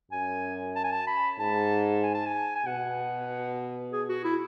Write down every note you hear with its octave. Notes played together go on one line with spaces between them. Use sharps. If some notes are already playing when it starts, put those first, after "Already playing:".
F#2 G#5
A5
G#5
A5
B5
G#2 A5
G#5
A5
G#5
G#5
B2 F#5
G#4
F#4
E4